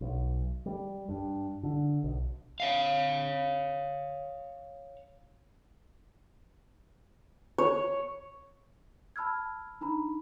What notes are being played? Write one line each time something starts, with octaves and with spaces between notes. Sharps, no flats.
B1
G3
G2
D3
B1
C#5 F5
C#5
A5 B5 E6 F6 G#6
D4 D#4 A#5 B5